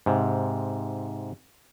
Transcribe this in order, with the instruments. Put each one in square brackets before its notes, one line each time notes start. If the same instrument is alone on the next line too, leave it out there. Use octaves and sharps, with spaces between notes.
[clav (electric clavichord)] G#2 C3